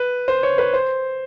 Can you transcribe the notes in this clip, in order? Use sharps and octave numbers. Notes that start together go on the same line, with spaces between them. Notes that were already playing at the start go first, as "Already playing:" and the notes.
Already playing: B4
C5
C#5
B4
C5